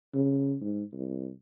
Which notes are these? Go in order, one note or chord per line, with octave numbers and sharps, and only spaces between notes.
C#3
G#2
C2